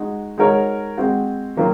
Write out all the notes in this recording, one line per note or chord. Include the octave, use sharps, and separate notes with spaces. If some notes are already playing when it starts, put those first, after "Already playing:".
Already playing: G#3 D#4 F#4
G#3 D#4 F#4 A#4 C#5
G#3 C4 F#4
D#3 F#3 A#3 F4